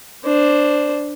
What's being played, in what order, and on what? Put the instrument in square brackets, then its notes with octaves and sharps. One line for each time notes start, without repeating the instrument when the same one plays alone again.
[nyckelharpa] D4 C5